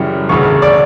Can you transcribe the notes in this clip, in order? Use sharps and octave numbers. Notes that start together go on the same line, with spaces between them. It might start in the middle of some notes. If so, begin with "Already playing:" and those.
Already playing: F#2 C#3 E3 G3 C#4
E1 D2 C#3 C#6
D5